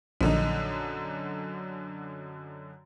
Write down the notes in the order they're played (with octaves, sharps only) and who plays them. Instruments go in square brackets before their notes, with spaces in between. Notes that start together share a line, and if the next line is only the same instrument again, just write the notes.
[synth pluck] A#1 [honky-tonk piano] F#2 D3 D#4